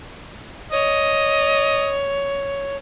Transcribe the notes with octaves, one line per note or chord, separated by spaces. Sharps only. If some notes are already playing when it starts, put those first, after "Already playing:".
C#5 D#5